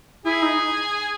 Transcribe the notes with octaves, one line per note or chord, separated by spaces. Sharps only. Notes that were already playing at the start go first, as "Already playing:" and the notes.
E4 G#4
D#4